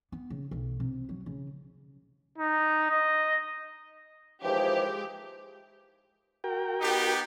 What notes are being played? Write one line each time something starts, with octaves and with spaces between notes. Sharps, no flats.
B3
C#3
B1
C3
F#3
C#3
D#4
D#5
D#2 E3 F3 G#3 G4
F#4 A#4 G5
B3 D#4 G4